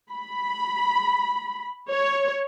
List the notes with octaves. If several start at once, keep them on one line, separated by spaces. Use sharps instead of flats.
B5
C#5